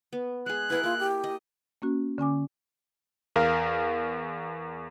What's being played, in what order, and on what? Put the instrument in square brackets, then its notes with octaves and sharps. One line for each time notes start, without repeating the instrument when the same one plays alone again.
[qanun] B3
[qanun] G#3 G#4 [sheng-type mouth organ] F#6
[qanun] E4 G#4 A#4 [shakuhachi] B4
[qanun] A#3 [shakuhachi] F4
[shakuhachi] G4
[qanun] D#5
[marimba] A#3 C#4 F#4
D3 C#4 G#5 D6
[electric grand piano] E2 A#4 F5